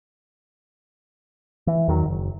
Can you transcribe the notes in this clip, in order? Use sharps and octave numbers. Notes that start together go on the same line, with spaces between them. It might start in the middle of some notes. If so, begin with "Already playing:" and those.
E3
E2 D#3 F#3
F#1